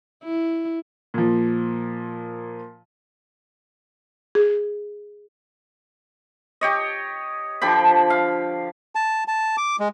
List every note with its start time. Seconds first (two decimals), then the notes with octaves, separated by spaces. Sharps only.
0.24 E4
1.14 A#2 F3
4.35 G#4
6.61 G4 C#5 D#5
7.61 D3 F3 G4 B5
8.10 F5
8.95 A5
9.28 A5
9.57 D6
9.80 G#3